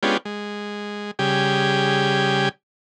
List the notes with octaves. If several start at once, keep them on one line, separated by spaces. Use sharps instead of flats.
G#3 B3 C#4 D4 F4 G4
G#3
C#3 G3 G4 G#4